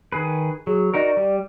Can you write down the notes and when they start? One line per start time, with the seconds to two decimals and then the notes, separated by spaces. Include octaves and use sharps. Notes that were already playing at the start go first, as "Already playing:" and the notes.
0.12 D#3 G#4 B4
0.67 F#3 G#4
0.94 D#4 F#4 A#4 D5
1.17 G3